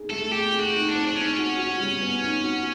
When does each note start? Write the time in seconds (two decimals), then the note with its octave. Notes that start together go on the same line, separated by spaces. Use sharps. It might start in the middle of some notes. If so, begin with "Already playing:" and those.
Already playing: D#4 G#4
0.10 A3 A4
0.32 G4 G#4
0.53 G#4
0.60 F#4
0.75 D#4
0.88 D4
0.95 C4
1.08 D4
1.16 C#4 D#4
1.38 F#4
1.59 F#4
1.80 G3
2.01 B3
2.22 D#4
2.44 F#4